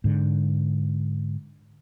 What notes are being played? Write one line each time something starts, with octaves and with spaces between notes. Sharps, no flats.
G#2 D3